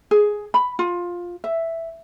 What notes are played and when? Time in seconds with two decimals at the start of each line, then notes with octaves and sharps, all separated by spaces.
0.11 G#4
0.54 B5
0.79 F4
1.44 E5